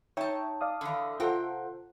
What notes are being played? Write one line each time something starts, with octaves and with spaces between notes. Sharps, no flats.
D#4 C#5 E5 G5 A5
D5 F5 D#6
D3 E3
C3 F4 A4 C5 F#5 G5